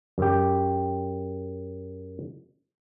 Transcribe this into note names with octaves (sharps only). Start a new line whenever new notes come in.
F#2 G4